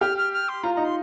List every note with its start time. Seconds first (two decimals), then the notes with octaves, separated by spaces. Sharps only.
0.01 G4 F6
0.17 F6
0.33 F6
0.49 C6
0.63 F4 A#5
0.75 D#4 A#5
0.85 C6